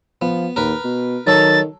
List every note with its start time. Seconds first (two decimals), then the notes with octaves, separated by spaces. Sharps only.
0.22 F3 B3
0.56 D#2 A#4 B4
0.84 B2
1.27 D#3 F#3 A4 A6